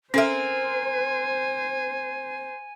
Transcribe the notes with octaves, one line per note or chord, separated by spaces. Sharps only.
C4 C#4 A4 A#4 C5 E5 G#5